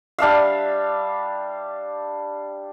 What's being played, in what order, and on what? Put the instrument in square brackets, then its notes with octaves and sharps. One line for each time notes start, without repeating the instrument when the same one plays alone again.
[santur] G3 D4 E5 F5